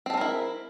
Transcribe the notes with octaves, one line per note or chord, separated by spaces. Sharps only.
G#3 C4 E4 A4 A#4